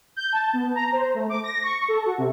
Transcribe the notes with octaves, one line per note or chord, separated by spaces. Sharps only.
G6
A5
B3
A#5
C5
A3
D6
A#6
C#6
A4
F#4
C3